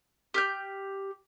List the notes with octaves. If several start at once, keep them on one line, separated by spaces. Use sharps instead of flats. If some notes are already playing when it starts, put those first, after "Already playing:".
G4 F6 G6